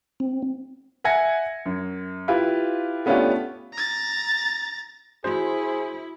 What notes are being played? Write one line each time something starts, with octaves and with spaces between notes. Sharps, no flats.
C4
E5 F#5 G#5 G#6 A#6 C#7
F#2
E4 F4 G4 B4
A3 B3 C#4 D4 F4 G4
A#5 A6
E4 F#4 G#4 C5